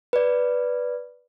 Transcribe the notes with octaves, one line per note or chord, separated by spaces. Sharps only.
B4 D5